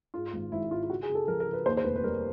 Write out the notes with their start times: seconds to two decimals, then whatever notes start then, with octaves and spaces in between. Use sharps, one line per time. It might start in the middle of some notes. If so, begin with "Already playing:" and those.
0.14 G#2 F4
0.33 G#1
0.52 G#1 E4
0.71 G#2 F4
0.83 F4
0.90 C#3 F#4
1.03 G#4
1.09 C#3
1.15 A4
1.27 F3 A#4
1.40 A#4
1.47 C#3
1.53 B4
1.66 D#2 C5
1.77 C5
1.85 F1 B4
1.96 B4
2.03 G3 A#4